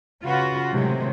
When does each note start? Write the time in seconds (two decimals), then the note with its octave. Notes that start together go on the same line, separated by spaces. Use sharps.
0.22 C#3 F4 F#4 B4
0.72 A2 C3 D#3 F#3 G#3